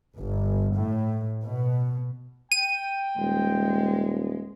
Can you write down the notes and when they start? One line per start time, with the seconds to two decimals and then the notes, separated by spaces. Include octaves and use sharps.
0.18 G1
0.74 A2
1.44 B2
2.52 G5 D#7
3.18 D#1 G#3